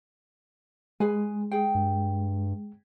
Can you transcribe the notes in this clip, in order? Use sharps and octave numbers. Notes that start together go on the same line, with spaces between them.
G#3 G#4 B4 G#5
G#4 G5
G2